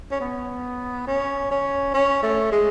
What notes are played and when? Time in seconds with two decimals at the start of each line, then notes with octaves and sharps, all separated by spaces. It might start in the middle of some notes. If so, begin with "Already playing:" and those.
0.11 C#4
0.20 B3
1.07 C#4
1.51 C#4
1.94 C#4
2.23 A3
2.52 G#3